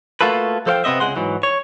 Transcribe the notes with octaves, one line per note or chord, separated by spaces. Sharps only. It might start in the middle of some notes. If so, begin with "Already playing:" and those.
A3 A#3 F4 F#4 A4 B4
F3 A4 C5 C#5 F5 G5
C3 B3 C4 D#5 E5
C#2 G#3 F#5 C6
G#2 E3 F#3
C#5